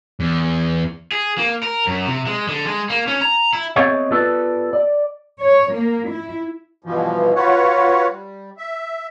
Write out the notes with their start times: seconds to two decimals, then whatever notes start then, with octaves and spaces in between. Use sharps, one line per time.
0.20 E2
1.12 G#4
1.38 A#3
1.63 A#4
1.87 F#2
2.06 C3
2.27 G#3
2.48 D3
2.67 G#3
2.90 A#3
3.08 C#4
3.21 A#5
3.53 E4
3.76 B3 C4 G#4 C#5 D#5 E5
4.11 B3 F4 G4 A4 B4 D5
4.73 D5
5.42 C#5
5.73 A#3
6.10 E4
6.84 G2 B2 E3 F3
7.36 F4 F#4 B4 C#5 F#5
8.09 G3
8.57 E5